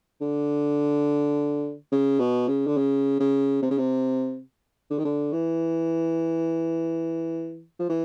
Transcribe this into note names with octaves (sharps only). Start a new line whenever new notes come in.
D3
C#3
B2
C#3
D3
C#3
C#3
C3
C#3
C3
D3
D#3
D3
E3
F3
E3